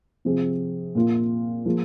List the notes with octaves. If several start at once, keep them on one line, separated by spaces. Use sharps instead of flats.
C3 F3 C4 G#4
A#2 A#3 F4
F3 A#3 F4 G#4